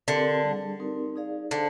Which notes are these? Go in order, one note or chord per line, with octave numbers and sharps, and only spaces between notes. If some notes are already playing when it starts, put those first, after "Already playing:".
D3 C4 G4 A#4
G3 D4 G#4
C4 D#4 G4 A#4
D#4 G#4 D5 F5
D3 D4 G#4 C5 F5